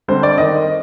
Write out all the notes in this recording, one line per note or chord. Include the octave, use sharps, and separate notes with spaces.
D3 G3 C4 C5
D5
D#3 D#5